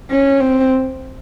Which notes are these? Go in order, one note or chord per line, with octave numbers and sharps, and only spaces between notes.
C#4
C4